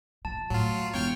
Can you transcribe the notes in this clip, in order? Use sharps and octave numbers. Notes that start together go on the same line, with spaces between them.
E1 F3 A5
A2 F#3 F4
E1 F#2 C#5 G5 F6